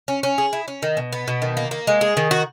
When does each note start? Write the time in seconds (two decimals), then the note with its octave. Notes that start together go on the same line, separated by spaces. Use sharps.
0.08 C#4
0.23 C#4
0.38 G#4
0.53 E4
0.68 C#4
0.83 D#3
0.97 B2
1.13 B3
1.28 B2
1.42 D#3
1.57 A#3
1.71 A#3
1.87 G#3
2.01 G#4
2.17 D#3
2.31 F#4